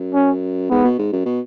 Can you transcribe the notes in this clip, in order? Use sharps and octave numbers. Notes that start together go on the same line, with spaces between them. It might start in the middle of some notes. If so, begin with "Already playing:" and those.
Already playing: F#2
C#4
G#2 B3
B2
G#2
F#2
B2